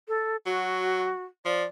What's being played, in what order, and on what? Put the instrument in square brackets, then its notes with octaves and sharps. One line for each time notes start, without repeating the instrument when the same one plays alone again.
[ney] A4
[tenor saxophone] F#3 [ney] F#4
[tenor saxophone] F3 [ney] D5